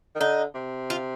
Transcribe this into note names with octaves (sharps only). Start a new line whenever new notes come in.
D#3
D3 D#4
C3
F4